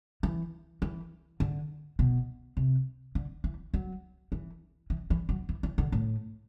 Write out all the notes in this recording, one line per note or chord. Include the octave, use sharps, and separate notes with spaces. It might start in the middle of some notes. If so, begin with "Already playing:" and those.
E3
E3
D3
B2
C3
D3
E3
F#3
E3
E3
E3
F#3
E3
E3
D3
A2